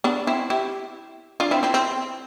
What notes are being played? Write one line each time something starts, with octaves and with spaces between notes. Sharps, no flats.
B3 D4
C4 E4
E4 G4
D4 F4
C4 E4
C4 E4
C4